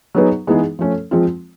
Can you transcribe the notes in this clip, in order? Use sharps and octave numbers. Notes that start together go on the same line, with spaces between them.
F#3 B3 D#4 G#4 B4
E3 G#3 B3 D#4 G#4
F3 A3 C#4
F3 G#3 C4 F4